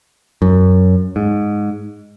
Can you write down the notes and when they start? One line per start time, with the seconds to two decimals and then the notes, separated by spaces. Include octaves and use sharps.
0.42 F#2
1.16 G#2